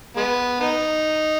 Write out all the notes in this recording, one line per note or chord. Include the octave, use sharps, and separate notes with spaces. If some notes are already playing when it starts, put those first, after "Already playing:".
G#3 B3
B3 D#4